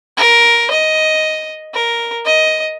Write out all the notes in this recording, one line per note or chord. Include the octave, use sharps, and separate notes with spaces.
A#4
D#5
A#4
D#5